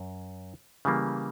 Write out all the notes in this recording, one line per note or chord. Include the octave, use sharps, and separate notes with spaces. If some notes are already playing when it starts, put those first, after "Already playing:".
Already playing: F#2
C#3 E3 G3 A#3